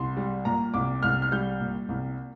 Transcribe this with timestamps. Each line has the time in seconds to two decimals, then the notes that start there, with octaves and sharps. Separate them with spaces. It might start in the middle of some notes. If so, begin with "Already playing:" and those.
Already playing: C2 C6
0.17 G3
0.45 A#2 A#5
0.74 C2 D6
1.03 C2 F6
1.22 F6
1.32 G3 G6
1.60 A#2
1.89 C2